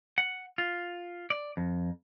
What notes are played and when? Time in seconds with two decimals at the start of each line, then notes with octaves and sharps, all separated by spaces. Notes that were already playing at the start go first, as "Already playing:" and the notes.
0.18 F#5
0.58 F4
1.30 D5
1.57 F2